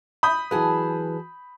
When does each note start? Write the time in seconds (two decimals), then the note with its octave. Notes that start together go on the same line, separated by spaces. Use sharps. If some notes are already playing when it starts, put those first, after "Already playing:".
0.23 B5 D#6 G6
0.51 E3 F#3 G#4 B4 A5